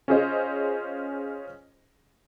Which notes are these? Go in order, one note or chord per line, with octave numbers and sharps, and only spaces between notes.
C#4 F4 G#4 C5 D#5